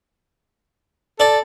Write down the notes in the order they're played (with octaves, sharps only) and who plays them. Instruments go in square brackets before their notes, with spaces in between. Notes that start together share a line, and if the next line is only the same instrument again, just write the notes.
[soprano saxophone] A4 [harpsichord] D5